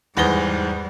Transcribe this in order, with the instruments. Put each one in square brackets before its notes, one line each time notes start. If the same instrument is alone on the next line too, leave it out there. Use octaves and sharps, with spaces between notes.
[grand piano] E2 A#6 G7 [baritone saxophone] G#2 [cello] G3 [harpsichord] B3